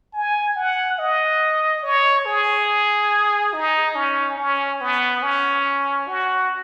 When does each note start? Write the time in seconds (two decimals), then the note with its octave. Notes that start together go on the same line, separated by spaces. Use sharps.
0.14 G#5
0.56 F#5
0.99 D#5
1.83 C#5
2.26 G#4
3.54 D#4
3.95 C#4
4.38 C#4
4.81 B3
5.23 C#4
6.08 F#4